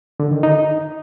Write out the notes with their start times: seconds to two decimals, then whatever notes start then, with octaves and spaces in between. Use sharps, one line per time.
0.20 D3
0.31 D#3
0.43 D#4